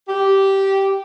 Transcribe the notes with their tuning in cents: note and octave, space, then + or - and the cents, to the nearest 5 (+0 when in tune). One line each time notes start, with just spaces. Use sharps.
G4 -10